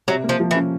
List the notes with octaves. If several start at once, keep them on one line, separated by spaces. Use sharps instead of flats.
C3 F#3
A#3
F3
F3
E3
C#4